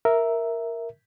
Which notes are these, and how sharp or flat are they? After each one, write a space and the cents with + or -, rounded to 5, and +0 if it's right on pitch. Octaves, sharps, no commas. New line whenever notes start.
A#4 +0 E5 +0